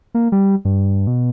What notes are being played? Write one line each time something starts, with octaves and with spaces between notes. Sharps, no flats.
A#3
G3
G2
B2